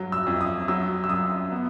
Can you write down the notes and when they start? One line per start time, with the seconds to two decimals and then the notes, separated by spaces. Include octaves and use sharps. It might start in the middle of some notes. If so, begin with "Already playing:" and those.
Already playing: G2 F#3
0.12 E6
0.27 F2
0.41 D#6
0.68 F#3 E6
1.04 E6
1.09 F#2 D#6
1.52 B3